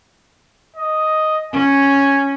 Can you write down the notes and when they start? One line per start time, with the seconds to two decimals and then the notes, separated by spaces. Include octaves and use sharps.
0.76 D#5
1.53 C#4 G#5